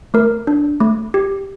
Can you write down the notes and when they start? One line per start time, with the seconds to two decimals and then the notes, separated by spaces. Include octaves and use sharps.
0.14 A3 A#4
0.47 D4
0.80 A3
1.14 G4